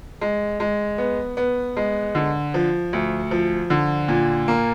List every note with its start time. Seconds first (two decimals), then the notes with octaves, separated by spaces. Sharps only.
0.21 G#3
0.60 G#3
0.98 B3
1.37 B3
1.77 G#3
2.15 D3
2.54 F3
2.93 D2
3.31 F3
3.70 D3
4.08 A#2
4.48 A#3